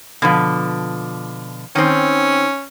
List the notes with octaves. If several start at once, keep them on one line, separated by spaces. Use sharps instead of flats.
B2 D3 F3
D#3 C4 C#4